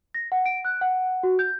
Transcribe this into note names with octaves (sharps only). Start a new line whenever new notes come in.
A#6
F#5
D7
F#6
F#5
F#4
G6